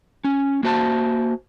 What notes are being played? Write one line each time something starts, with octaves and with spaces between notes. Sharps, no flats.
C#4
A#3 F#4 C5 A5